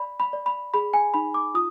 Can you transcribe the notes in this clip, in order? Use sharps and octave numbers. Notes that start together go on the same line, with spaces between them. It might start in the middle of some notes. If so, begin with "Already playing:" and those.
Already playing: D5 B5
B5
D5
B5
G#4 B5
G#5
D#4 B5
D6
F4 D#6